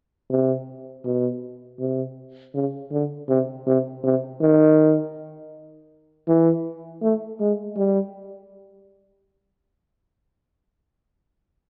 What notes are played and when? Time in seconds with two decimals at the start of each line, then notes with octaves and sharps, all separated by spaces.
0.30 C3
1.05 B2
1.80 C3
2.54 C#3
2.92 D3
3.29 C3
3.67 C3
4.04 C3
4.41 D#3
6.28 E3
7.02 A3
7.40 G#3
7.77 G3